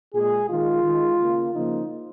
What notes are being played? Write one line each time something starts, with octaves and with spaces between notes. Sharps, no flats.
A#2 G#3 G#4
D#3 G#3 F4
D#3 G#3
C#3 A#3
C#3 F3 A#3 D#4